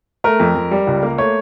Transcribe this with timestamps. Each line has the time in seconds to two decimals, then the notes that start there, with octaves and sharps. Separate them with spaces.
0.24 A3 A#4
0.40 F2
0.55 F2
0.71 G3
0.87 C#2
1.03 A#3
1.18 A3 C#5